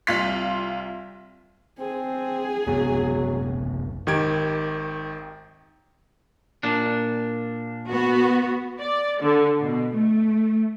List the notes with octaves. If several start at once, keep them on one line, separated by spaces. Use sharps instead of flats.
C2 F4 C6 B6
C4 G#4
F#2 C3 F#3 B3
G#1 D#3 G4 G#6 D7
A#2 D4
B3 F#4
D5
D3
B2
A3